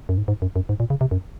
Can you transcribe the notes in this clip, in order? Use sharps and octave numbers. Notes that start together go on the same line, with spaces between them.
F#2
G#2
G#2
F#2
F#2
G#2
A#2
C#3
C3
F#2